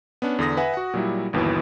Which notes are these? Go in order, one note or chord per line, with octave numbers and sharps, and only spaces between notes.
B3 C#4 D4
E2 D3 D#6 A#6
B4 E5 F#5 G#5
F#4 F#5
A#2 F#3 G3 E4
G1 D#2 B2 E3 E4